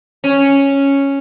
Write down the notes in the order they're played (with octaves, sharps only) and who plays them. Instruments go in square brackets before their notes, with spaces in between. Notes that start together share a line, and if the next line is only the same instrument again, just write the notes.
[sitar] C#4